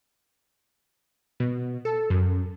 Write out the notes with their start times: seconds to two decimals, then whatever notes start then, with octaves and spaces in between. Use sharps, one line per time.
1.40 B2
1.85 A4
2.10 F#2